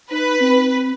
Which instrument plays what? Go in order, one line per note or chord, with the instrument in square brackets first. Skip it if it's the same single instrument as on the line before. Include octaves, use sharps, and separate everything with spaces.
[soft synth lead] D#4 [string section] B4
[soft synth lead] C4